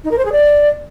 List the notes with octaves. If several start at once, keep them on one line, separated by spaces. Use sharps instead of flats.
D#4
A#4
C5
G#4
D5